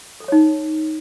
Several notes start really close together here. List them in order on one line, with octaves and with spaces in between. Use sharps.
A4 G#5 C#5 D#4